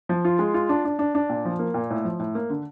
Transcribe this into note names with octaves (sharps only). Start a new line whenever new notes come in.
F3
F4
G#3
F4
D4
D4
D4
D4
A#2
F3
A#3
A#2
A2
F3
A2
A#3
D3